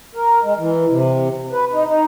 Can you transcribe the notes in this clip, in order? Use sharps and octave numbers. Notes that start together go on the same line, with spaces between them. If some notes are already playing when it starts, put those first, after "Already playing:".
A#4
G#3
E3
C3
B4
D#4
D#4